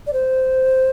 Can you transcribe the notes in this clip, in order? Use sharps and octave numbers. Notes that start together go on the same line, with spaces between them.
D5
C5